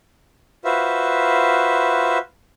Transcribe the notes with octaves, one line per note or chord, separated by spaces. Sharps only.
F4 F#4 B4 C5 E5